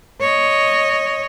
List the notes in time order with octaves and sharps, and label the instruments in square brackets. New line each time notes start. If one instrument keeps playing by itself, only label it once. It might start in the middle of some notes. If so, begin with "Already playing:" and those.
[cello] C#5 D#5